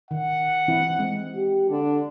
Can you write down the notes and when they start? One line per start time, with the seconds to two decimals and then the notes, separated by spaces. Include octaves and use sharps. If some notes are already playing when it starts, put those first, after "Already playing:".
0.11 D#3 F#5
0.68 E3 C4 E4
0.99 G#3 C4
1.36 G4
1.70 D3 D4